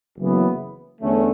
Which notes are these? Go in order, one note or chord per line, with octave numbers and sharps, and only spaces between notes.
F#1 F#2 E3 B3
E2 D3 A3 C#4